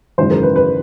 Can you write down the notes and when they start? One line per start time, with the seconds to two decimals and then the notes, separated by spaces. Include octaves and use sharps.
0.18 G#1 F#2 C#3 E3 C5
0.31 A#4
0.43 B4
0.56 B4